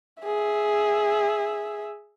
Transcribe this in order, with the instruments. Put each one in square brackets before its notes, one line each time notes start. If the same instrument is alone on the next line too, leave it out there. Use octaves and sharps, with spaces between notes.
[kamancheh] G#4 E5